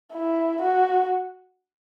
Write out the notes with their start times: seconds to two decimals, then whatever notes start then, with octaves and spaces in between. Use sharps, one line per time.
0.13 E4
0.62 F#4